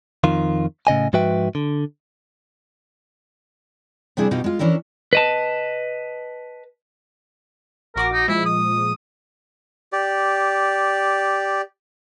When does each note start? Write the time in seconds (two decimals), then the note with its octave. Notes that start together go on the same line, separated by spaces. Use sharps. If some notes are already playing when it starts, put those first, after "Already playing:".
0.24 F2 D#3 F4
0.87 A2 C#3 D#5 G#5
1.13 G#2 F3 F#4 B4 E5 G5
1.55 D3
4.17 C3 G3 C4 D4 E4 G#4
4.31 B2 D#4 F4 G4 D#5
4.44 G#3 F4
4.59 E3 C#4 D4 E4 A#4
5.13 B4 D#5 A5
7.96 A#1 F#4 A#4 D6
8.12 D#4
8.28 A#2 F3 G#3 E4
8.45 D#6
9.92 G4 D5